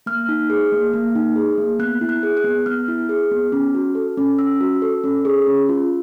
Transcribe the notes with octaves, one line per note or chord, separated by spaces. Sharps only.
A#3 F6
D#4
G#4
A#3
A#3
D#4
G#4
A#3
B3 F#6
E4
F#6
G#4
F#6
B3
B3 F6
E4
G#4
B3
C#4
F#4
A4
C#4
C#4 E6
F#4
A4
C#4
G#4
C#4
F4